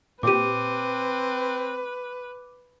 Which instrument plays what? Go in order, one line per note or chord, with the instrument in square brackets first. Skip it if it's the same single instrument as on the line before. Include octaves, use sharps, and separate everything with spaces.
[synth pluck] A#2 G4 [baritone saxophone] C4 [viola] B4 [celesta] D6 D#7